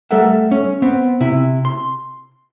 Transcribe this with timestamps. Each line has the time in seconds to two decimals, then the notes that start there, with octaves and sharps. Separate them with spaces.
0.11 G3 A3 A4 A#4 E5 F#5
0.51 C#4
0.82 B3 C4
1.21 C3 E4
1.65 C6